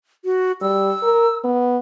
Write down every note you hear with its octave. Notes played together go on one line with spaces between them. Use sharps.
F#4
G3 E6
A#4
B3